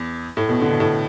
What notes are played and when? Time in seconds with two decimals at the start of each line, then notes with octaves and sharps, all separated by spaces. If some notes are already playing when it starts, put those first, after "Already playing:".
Already playing: E2
0.37 A2
0.49 B2
0.61 D3
0.71 B2
0.80 A2